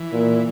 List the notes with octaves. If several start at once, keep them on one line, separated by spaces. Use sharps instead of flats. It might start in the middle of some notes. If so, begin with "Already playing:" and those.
Already playing: E3
A#2